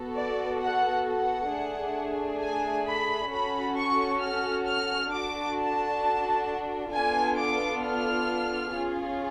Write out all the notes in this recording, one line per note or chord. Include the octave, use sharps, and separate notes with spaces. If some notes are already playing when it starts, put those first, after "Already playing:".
Already playing: B3 F#4 A4
D5
F#5
F#5
A3 D4 G#4
G#5
B5
C#4 F#4 A4 B5
C#6
F6
F6
D4 F#4 A4 D6
A5
B3 D4 F4 A4 G#5
D6
F6
C#4 F4 G#4